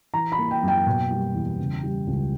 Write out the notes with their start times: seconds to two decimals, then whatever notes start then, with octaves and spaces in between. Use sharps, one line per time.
0.13 E3 A#5
0.32 B5
0.38 A#3
0.51 G5
0.63 F#2
0.68 G5
0.87 B2
1.11 G3
1.34 E2
1.59 C#3
1.83 G3
2.07 C#2